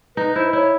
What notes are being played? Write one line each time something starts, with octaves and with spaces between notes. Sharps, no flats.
D#4 B4
E4 C5
C5
E4 C#5